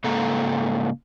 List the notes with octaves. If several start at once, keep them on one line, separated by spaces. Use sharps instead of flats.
G#2 C#3 A#3 A4 A#5